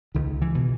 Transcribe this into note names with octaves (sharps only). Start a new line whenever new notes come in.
C#2 D#3
E3
B2